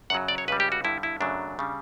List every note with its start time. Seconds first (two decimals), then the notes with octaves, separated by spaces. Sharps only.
0.10 F#2 C#3 F#3 F#5
0.28 D5
0.38 C#5
0.48 C#2 C#3 G3 B4
0.60 G4
0.72 F#4
0.84 G2 D3 G3 E4
1.03 E4
1.20 F#2 C#3 F#3 A3 D4
1.59 C#3 G3